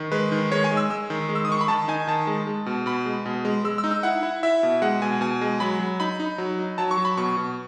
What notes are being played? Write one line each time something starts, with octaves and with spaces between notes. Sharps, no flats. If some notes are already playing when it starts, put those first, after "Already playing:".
Already playing: D#3
G#3 B4
D#3
G#3 C#5
G#5
G#3
E6
G#3 E6
D#3
G#3
E6
D#6
D#3 C#6
B5
D#3 A5
D#4 G#5
D#3 A5
G#3
G#3
B2
B2 B5
G#3
B2
G#3
G#3 E6
E6
D#4
E6
E4 F#5
E4
E4 E5
B2
G#3 F#5
B2 G#5
B2 G#5
G#3
F#3 B5
F#3
D#4 B5
D#4
F#3
D#4
F#3 A5
C#6
F#3
B5
B2 C#6
B2